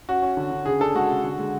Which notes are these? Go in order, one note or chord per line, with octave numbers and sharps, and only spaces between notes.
C#4 F#4
C#4
D3
D3
C#3 G#4
D4 A4
G#3 F#4
C#3
D3
G#3